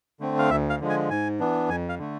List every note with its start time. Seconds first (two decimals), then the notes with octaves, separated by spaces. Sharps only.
0.20 D3 A3 C4
0.39 F5
0.50 D2 E5
0.70 F5
0.80 D3 F3 G#3
0.90 G#5
1.10 G#2 G#5
1.40 E3 B3 D4
1.69 F2 G#5
1.89 F5
1.98 D3 A3